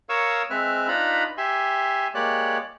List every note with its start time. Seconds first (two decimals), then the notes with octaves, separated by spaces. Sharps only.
0.09 A#4 C#5 F5 C#6 D#6 E6
0.50 G#3 C4 B4 E5 F6
0.88 D4 D#4 F4 B4 A#5 B5
1.37 G4 E5 G#5 C6
2.15 G#3 A#3 G4 C#5 D5 F#6